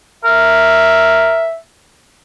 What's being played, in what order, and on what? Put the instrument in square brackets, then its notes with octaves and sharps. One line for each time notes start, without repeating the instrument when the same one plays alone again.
[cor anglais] A#4 [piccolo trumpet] E5